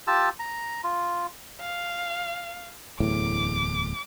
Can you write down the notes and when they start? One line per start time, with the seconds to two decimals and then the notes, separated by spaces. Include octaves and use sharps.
0.07 F4 G4 A5 E6
0.39 A#5
0.84 F4
1.61 F5
3.00 D1 E2 A2 D6